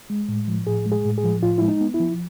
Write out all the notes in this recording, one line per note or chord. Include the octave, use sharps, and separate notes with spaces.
G#3
A2
F3
A2 G#4
G#3
G#4
A2
G#4
F3
A2 F4
G#3 E4
D#4
B3
E4
F3